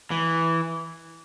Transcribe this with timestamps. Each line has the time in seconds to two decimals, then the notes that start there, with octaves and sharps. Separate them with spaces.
0.11 E3